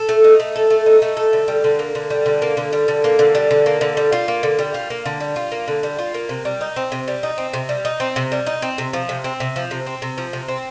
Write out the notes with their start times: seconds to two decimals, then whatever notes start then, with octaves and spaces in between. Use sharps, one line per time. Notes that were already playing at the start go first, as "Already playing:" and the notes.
Already playing: A4
0.09 A3
0.24 D#4
0.40 A3
0.56 A4
0.70 A3
0.86 D#4
1.02 A3
1.17 A4
1.33 D3
1.48 G3
1.64 D3
1.79 A#3
1.95 D3
2.10 G3
2.26 D3
2.42 A#3
2.57 D3
2.73 G3
2.88 D3
3.04 A#3
3.19 D3
3.35 G3
3.51 D3
3.66 A#3
3.81 D3
3.97 G3
4.12 F4
4.28 A#3
4.43 D3
4.59 G3
4.74 F4
4.90 A#3
5.05 D3
5.20 G3
5.36 F4
5.52 A#3
5.68 D3
5.83 G3
5.99 F4
6.14 A#3
6.29 C3
6.45 G3
6.61 D#4
6.76 C4
6.92 C3
7.08 G3
7.23 D#4
7.38 C4
7.53 C3
7.69 G3
7.85 D#4
8.00 C4
8.16 C3
8.32 G3
8.46 D#4
8.62 C4
8.78 C3
8.93 F3
9.09 C3
9.24 C4
9.40 C3
9.56 F3
9.71 C3
9.86 C4
10.02 C3
10.18 F3
10.33 C3
10.48 C4